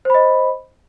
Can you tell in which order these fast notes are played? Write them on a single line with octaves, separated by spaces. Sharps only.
C5 B5 D#5